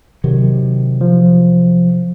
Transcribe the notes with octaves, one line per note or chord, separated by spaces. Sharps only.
C3 D#3 F#3
F3